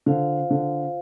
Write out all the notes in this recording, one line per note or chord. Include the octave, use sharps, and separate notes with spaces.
D3 F4 C5 F5
D3